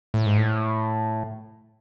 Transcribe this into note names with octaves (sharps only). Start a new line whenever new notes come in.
A2
G#2
A2